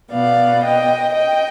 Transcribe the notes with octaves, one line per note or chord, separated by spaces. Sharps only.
B2 B3 D5 F5
D#5 G5
D#5 G5